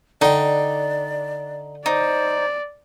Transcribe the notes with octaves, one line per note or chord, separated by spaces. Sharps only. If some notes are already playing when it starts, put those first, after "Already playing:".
D3 D#4 D5 G5
D#4 C5 D5